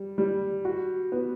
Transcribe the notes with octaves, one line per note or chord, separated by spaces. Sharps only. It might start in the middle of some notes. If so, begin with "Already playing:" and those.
Already playing: G3
G3
F#4
B3